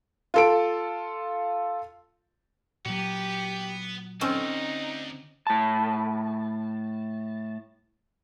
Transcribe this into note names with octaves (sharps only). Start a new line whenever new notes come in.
F4 A4 D7
A#2 F#3 B3 G4
D2 C4 C#4 D#4
A2 A5